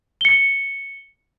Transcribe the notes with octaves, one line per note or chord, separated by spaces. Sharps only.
C#7 G7